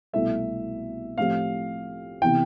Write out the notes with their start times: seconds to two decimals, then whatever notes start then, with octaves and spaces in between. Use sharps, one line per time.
0.13 C2 B2 A3 E4 A4 E5
1.18 A2 F3 C4 G4 F5
2.22 C3 E3 B3 E4 G5